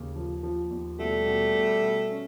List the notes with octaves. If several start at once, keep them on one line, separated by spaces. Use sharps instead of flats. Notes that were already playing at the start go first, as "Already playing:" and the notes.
Already playing: D#2 C#3
F3
F3
D#2
B2 G3 A3
B2
B2
B2
C#4